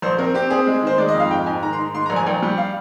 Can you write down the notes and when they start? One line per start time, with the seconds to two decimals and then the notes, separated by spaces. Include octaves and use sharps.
0.02 A#1 C5
0.18 C4 A#4
0.34 C4 G4
0.50 C4 G#4
0.67 G#3
0.83 D#3 C5
0.98 G#3 D5
1.08 D#5
1.15 F2
1.20 F5
1.30 G#2 G5
1.46 G#2 G#5
1.62 D#3 A#5
1.73 C6
1.78 D#3
1.94 G#2 C6
2.06 A#5
2.10 A#1
2.16 G#5
2.27 A#1 G5
2.42 G3
2.58 F5